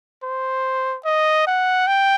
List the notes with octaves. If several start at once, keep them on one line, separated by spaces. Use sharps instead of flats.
C5
D#5
F#5
G5